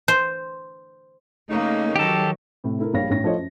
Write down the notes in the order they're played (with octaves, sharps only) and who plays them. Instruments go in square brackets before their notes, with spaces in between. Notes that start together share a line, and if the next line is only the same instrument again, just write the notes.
[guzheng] C5
[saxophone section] C#3 D#4 [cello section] A3 A#3
[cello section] D#3 F#3 [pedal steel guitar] G4 A4
[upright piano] A2 C3
A3 E4 A#4
A#1 G3 D4 C#5 F5 A#6
A1 C#4 A#6
F3 A3 F4 C5 C#5 D#5
F#2